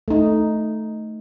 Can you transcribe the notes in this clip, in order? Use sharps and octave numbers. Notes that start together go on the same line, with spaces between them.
A3 D#4